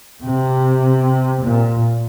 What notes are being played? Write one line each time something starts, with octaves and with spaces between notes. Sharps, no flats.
C3
A#2